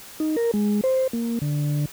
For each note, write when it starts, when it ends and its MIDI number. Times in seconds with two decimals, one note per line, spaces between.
0.20 0.36 63
0.37 0.51 70
0.54 0.81 56
0.84 1.07 72
1.13 1.39 58
1.42 1.85 50